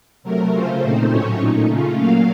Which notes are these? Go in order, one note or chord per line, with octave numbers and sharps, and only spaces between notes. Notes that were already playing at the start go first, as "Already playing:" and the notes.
C3 F#3 A3 A#4
C#3 A3 C#4 F4 C5
A#2 A3 C4 D#4
A2 F#3 A3 C#4 C#5
A#2 A3 D#4
C#3 A3 C#4 F4
A#2 F#3 A#3 F5